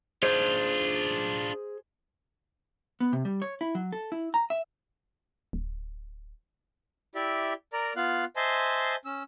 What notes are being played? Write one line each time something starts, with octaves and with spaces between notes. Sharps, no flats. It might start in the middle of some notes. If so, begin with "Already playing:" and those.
D4 F4 G#4 C5
B3
C3
G3
C#5
E4
F#3
A4
E4
A#5
E5
D1
E4 G4 D5 E5
A#4 D5 A#5
B3 F4 F5 F#6
C5 D#5 E5 G#5 A5 C6
C#4 E6